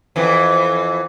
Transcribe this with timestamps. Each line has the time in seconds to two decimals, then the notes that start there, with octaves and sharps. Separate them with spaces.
0.16 F2 E3